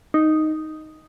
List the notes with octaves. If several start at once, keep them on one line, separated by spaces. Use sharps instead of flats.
D#4